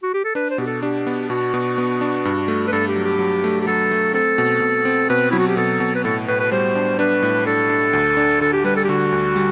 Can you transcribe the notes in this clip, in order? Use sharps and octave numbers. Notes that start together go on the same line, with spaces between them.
F#4
G4
A4
D4 B4
C5
B2 G4
A4
D4 G4
B3
B2 F#4
B2
B3
D4
G2
A3
B4
G2 A4
G4
F#3
G4
F#3
A3
G4
F#3 A4
A3
C4 A4
B2
B2
C4
B2 B4
F#3 E4
F#4
G4
B2 A4
B2
B4
A2 A4
A2 B4
B4
G3 C5
D4
D4 B4
A2
D4 A4
D4
D2
D4
D3 A4
G4
G3 B4
A4
G4
D3 F#4
D2
G3